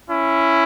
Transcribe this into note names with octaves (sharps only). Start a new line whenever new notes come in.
C#4 E4